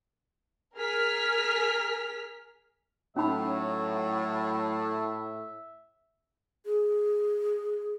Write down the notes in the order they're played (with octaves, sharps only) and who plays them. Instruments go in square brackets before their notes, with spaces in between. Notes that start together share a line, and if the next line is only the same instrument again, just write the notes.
[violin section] G#4 A#4 F6 B6
[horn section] A2 [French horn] F#3 [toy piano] C#4 D#4 B5 [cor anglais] E5
[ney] G#4